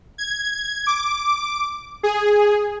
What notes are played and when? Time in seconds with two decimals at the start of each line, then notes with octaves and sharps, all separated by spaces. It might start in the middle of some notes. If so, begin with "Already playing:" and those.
0.18 G#6
0.87 D6
2.03 G#4